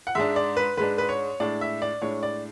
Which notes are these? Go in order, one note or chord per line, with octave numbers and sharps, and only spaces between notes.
F#5
G#2 G#3 D4 E5
D5
B4
G#2 G#3 D4 B4
B4
C#5
A2 G#3 D4 D5
E5
D5
A2 G#3 D4 C#5
D5